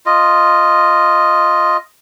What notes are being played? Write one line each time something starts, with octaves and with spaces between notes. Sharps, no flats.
F4 D#5